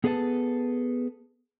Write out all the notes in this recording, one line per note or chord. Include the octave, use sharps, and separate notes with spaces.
B3 G#4 A4 B4 D#5 A5